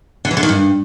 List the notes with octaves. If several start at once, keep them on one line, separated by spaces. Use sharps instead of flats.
D3
E3
D3
D#3
G2